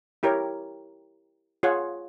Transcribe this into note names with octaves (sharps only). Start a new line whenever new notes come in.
E4 G4 A#4 C#5
F4 G#4 C#5 F#5